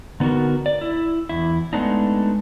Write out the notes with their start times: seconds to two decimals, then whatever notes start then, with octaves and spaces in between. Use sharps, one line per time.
0.20 D3 B3 D#4 F#4 A#4
0.66 D5
0.81 E4
1.29 E2 E4
1.73 G#3 A3 B3 D4 D#4